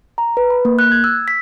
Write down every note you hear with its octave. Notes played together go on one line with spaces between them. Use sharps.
A#5
B4
B5
A#3
F#6
G#6
E6
B6